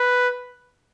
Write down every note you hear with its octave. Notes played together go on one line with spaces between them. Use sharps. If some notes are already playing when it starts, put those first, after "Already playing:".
Already playing: B4